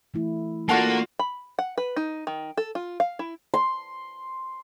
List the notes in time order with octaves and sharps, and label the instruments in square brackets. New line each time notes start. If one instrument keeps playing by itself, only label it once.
[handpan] E3 A3 E4
[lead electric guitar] A#3 [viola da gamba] D4 F4 F#4 [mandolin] A4 F#5 C#6
[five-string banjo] B5
F#5
B4
D#4
D#3
A4
F4
F5
E4
[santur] C6